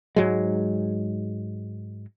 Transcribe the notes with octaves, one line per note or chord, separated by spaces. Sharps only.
G#2 F#3 G#3